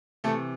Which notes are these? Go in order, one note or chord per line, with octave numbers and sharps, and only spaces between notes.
C3 E3 A3 A4